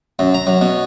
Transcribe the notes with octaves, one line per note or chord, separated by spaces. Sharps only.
F#2
A#5
F#2
B2